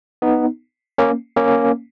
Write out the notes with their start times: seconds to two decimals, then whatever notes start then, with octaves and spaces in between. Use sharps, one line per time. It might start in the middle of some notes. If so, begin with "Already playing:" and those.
0.22 B3 D#4
0.98 A#3 C#4
1.37 A#3 C#4